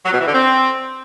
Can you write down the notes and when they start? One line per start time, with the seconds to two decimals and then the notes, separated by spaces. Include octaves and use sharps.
0.05 F#3
0.12 B2
0.19 E3
0.27 D3
0.34 C4